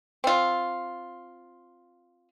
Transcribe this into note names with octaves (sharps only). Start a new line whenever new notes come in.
C4 F4